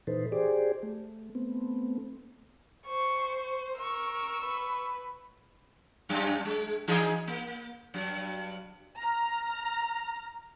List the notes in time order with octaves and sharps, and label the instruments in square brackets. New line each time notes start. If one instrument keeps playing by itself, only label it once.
[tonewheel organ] A#2 E3 D#4 A4 B4 C5
G4 G#4 C5 D5
A3
A3 B3 C4
[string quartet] C5 [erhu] C#6
[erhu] A#4 [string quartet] C#6 E6
[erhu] B4
[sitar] F#2 G3 D4
G#3
E3 D#4 G#4
A#3
G2 F#3
[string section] A#5 F6